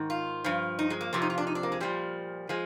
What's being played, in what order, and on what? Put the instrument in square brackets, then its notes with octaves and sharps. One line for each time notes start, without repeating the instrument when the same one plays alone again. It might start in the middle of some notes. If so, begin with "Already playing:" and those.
Already playing: [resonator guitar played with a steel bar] G#2 D#3
F4
G2 F3
D#4
G#3
A#3
F2 C3 F3 C4
D#4
F4
D4
D#4
D4
A#3
G#3
A#2 F3 G3
F3 G#3